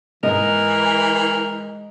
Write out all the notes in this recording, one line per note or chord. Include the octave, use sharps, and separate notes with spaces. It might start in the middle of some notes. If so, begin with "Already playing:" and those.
G#2 E3 A#4 D#5